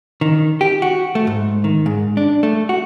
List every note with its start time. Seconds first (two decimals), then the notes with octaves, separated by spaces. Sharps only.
0.21 D#3
0.61 G4
0.82 F#4
1.15 A3
1.27 G#2
1.64 D#3
1.86 G#2
2.17 D4
2.43 A3
2.69 F#4